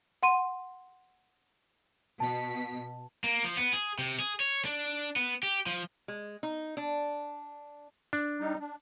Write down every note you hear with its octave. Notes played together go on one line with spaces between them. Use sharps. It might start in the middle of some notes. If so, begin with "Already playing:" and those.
F#5 C6 D#7
B2 A5 B6
A#3
F3
B3
G#4
C3
G#4
C#5
D4
B3
G4
F3
G#3
D#4
D4
D4
G3 D#4
D4